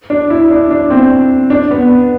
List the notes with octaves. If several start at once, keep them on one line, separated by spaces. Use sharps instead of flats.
D4
E4
D4
D4
C4
D4
B3